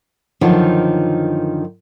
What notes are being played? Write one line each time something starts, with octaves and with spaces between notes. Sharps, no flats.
F#2 D3 D#3 F3 D#4